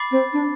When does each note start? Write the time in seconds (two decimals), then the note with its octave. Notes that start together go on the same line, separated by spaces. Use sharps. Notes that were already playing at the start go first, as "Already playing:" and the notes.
Already playing: B5 D6 A6 C7
0.11 C4
0.33 D4